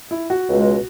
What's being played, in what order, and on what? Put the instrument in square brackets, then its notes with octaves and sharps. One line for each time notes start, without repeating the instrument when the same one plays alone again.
[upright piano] E4
F#4
[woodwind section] C#2 B2 G#3